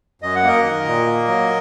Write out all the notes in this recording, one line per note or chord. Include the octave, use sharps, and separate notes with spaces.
F#2 D#5
F#5
A#3 A#4 D#5
D#3
A#2
A#3
F#3